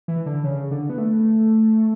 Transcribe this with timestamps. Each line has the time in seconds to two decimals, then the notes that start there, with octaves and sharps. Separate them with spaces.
0.08 E3
0.26 D3
0.44 C#3
0.71 D3
0.90 B3
0.98 A3